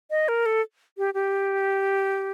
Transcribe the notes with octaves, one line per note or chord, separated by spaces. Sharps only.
D#5
A#4
A4
G4
G4